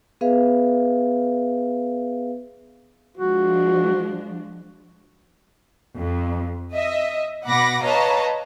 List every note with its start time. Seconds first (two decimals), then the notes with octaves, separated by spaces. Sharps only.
0.21 B3 G#4 B4 E5 F5
3.17 F3 G#3 D4 F#4
5.98 F2
6.73 D#5 E5
7.46 B2 F#5 B5 D6 A#6
7.84 B4 C#5 D#5 F5 A5 A#5